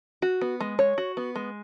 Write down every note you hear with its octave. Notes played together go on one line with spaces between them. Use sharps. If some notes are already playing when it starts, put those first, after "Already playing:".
F#4
B3
G#3
C#5
F#4
B3
G#3